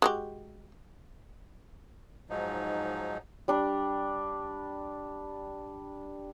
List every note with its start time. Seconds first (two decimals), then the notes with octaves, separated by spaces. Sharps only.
0.02 G#3 F#4 G4
2.30 G#2 F3 F#3 D#4
3.48 G3 D4